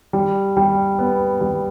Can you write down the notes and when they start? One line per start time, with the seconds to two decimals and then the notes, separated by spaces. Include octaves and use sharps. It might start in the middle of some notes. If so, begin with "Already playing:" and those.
0.13 G3
0.57 G3
0.99 B3
1.41 G3